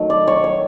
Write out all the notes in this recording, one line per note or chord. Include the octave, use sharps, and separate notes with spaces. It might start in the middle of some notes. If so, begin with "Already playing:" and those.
Already playing: D#3 F#3 A3
D5
C#5
C#5